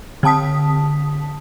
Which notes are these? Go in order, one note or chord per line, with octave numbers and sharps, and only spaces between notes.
D3 C4 A5 D#6 B6